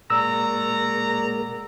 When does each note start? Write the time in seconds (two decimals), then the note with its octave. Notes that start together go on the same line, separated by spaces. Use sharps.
0.10 A#2 F#3 G#3 A#4 D5 A#5 E6